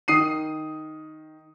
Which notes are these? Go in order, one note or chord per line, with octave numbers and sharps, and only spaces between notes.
D#3 D#6 C7 D#7